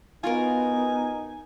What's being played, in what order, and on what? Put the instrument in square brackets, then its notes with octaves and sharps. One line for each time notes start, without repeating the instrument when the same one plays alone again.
[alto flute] B3 [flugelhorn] D#4 [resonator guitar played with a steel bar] F4 F#4 A#4 [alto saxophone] G#5